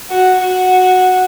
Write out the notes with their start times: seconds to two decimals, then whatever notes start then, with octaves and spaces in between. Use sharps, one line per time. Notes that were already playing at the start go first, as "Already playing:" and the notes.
0.10 F#4
0.39 F#4